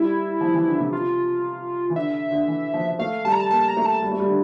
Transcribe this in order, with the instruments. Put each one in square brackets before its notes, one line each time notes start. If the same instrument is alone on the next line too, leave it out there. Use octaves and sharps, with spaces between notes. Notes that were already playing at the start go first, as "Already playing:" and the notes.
Already playing: [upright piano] G3 [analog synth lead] E4
[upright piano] F3
E3
D3
C3
[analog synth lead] F4
[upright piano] E3
[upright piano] D3 [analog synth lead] E5
[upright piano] D3
E3
F3
[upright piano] A3 [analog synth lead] F5
[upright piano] G3 [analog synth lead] A5
[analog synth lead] A#5
A5
[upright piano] A#3 [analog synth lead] A5
[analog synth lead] A#5
[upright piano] A3
[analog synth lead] A5
[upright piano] G3
A3
G3
D3